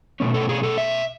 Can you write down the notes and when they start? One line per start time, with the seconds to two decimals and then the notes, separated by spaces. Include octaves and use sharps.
0.20 B2 A3 C#4
0.34 A4
0.49 G#4
0.63 A4
0.78 E5